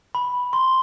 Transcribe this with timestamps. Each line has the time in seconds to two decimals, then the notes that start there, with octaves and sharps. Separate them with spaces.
0.15 B5
0.53 C6